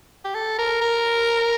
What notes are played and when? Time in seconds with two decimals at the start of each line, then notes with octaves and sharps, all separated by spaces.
0.25 G4
0.35 A4
0.58 A#4
0.82 A#4